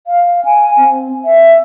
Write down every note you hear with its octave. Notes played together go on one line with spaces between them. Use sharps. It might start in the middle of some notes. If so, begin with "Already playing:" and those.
F5
G#5
C4
E5